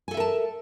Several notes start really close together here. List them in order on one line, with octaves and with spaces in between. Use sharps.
G#5 A4 E5 A#4 A5